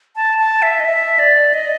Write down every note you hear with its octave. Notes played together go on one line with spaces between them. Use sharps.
A5
A5
E5
D#5
E5
D5
D#5